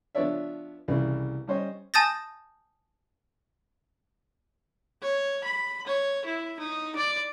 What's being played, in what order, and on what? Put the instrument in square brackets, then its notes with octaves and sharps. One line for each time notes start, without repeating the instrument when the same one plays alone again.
[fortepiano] F3 B3 D4 C#5 D5 E5
C2 C#3 E3
G3 C#4 C5 C#5 D#5
[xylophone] G#5 A5 D#6 G6 A6 A#6
[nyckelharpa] C#5
B5
C#5
E4
D#4
D5